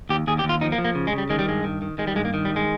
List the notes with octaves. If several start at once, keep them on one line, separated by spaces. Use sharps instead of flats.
D#2 G4
D#2 G#4
G4
D#2
F4
F3 D#4
A#3
F3
A#3
C#3
G#3
C#3
G3
D#3 G#3
G3
G2 G#3
D#3
D#3
D#3 G#3
G3
G2 G#3
A#3
D#3
G3
G2
G#3